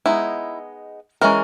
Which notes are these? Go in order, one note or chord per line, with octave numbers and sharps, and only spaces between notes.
G#3 B3 D#4 E4
E3 G#3 C#4 A#4